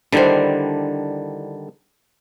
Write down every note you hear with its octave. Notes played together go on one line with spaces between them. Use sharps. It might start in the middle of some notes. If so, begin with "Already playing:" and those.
D3 D#3 G3 D4 E4 C5